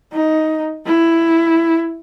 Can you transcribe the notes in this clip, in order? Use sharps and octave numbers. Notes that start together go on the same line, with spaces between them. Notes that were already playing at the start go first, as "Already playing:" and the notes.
D#4
E4